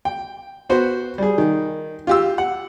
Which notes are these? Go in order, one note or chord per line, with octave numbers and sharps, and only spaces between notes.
G5
B3 F#4 C5
G3 G#4
D#3
F4 G4 E6
F#5